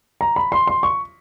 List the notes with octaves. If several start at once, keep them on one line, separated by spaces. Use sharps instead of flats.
A#5
B5
C6
C6
C#6